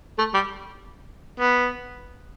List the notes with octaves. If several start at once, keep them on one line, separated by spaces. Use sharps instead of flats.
A3
G3
B3